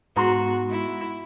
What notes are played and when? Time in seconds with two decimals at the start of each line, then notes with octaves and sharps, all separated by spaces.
0.16 G#2 B3 F#4 B4 A#5 C6
0.70 E4